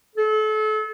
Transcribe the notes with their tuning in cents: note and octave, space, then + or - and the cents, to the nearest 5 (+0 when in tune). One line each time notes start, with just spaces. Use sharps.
A4 -35